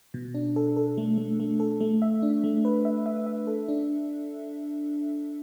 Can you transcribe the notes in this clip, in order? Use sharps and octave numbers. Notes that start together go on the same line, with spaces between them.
B2
D4
A4
A4
A3
A3
A3
A4
A3
E5
D4
A3
B4
E5
E5
E5
A4
D4